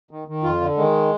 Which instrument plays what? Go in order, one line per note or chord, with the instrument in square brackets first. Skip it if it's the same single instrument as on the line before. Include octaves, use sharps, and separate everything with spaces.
[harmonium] D#3
D#3
F2 F4
D3
D#3 G#3